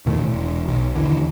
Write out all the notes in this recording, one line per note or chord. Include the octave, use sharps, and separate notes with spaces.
E2 A#2 D#3 A3
E1
B1
D#2 D3 E3